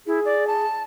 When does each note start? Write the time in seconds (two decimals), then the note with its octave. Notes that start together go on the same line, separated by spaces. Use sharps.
0.07 E4 G#4
0.25 D5
0.47 A5